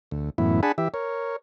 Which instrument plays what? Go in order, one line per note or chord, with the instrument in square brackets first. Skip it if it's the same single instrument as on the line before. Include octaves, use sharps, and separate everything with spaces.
[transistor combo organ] D2
F#2 A2 E3 B3 E4
D4 G#4 F#5 G#5 A5 B5
E3 G4 E5
A#4 C#5